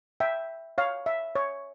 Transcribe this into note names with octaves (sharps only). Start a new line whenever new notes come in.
E5 G5
C#5 F5
E5
C#5